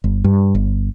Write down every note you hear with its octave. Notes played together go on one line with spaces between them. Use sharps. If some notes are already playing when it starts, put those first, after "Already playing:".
G1
G2
G1